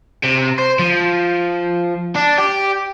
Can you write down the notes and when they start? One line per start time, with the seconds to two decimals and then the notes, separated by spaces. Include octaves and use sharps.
0.24 C3
0.59 C5
0.79 F3
2.16 D4
2.39 G4